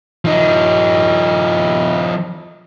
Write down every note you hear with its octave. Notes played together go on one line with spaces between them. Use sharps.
F3 D#4